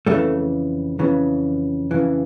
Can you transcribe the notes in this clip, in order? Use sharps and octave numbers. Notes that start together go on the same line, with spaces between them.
F2 C#3 E3 G3 A3
F2 C#3 E3
F2 C#3 E3